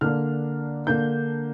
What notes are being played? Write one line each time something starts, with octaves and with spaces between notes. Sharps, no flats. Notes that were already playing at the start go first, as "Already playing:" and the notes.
D3 A#3 D4 F6
D3 A#3 D4 G6